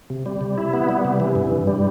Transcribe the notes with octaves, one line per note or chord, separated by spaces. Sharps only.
C3
G3
C3
E4
B3
G3
C3
E3
G2
G2
G3